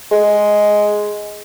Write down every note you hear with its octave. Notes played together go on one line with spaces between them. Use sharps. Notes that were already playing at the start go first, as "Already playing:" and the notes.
G#3